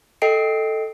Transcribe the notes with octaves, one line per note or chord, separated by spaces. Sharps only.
A4 D#5 G5 C7 D7